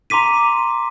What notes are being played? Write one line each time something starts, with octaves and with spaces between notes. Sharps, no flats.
A#5 C6 D6 B6 D#7